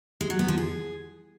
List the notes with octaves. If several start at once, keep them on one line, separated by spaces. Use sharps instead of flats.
G#3
F#3
B3
F3
G#4